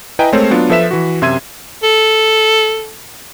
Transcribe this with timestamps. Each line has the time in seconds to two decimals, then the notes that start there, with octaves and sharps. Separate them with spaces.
0.19 E4 B4 D#5 G5 G#5 A#5
0.32 G#3 A3 C4 A#4 C5 C#5
0.51 F#3 B3 D4 F4
0.70 F3 A4 B4 E5 B6 E7
0.91 E3 F#4
1.22 F#2 C3 E5 C6 G#6 D#7
1.83 A4